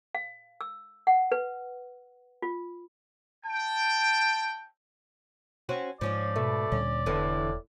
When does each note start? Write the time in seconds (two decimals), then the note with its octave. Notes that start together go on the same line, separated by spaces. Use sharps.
0.15 F5
0.61 E6
1.07 F#5
1.32 B4
2.42 F4
3.45 G5 A5
5.69 C4 C#4 F#4
6.01 G#2 F3 C#4 D4 D5
6.36 B2 A3
6.72 D2 A#2 G3 C#4
7.06 E1 E2 A2 D3 E3